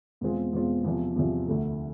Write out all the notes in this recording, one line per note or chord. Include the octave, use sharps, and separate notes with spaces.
E2 B2 G#3 C4 F4
E2 B2 G#3 C4 F4
E2 C3 F3
E2 C3 F3
D2 D3 A3